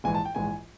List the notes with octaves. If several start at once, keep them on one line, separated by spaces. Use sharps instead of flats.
A#1 G#2 E3 G#5
A5
G5
A#1 G#2 E3 G#5